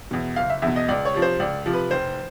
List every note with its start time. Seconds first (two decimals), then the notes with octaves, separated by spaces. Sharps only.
0.11 E2 B2
0.36 F#1 F5
0.50 E5
0.62 E2 B2 E5
0.76 D#5
0.89 C#2 D5
1.05 C#5
1.14 C3 F3
1.22 C5
1.40 C#2 D5
1.66 C3 F3
1.73 B4
1.91 F1 C5